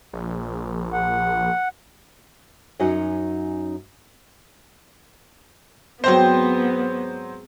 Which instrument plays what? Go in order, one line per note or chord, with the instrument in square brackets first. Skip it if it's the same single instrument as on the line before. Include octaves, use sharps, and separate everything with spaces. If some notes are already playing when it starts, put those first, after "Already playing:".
[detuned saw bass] A#1
[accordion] F#5
[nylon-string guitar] F#2 C#4 D#4 F#4 D#5 F#5
[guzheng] G#2 C4 A#5 [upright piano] F#3 C5 [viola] B3